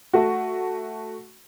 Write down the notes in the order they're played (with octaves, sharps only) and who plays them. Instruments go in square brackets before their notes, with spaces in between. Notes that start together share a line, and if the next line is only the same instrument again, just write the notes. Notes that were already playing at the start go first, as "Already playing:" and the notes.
[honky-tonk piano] A3 F#4